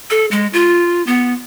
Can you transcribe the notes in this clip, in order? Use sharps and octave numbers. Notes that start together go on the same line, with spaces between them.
A4
G#3
F4
B3